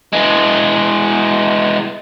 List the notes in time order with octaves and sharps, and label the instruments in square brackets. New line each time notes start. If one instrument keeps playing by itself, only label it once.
[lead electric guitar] E3 G#3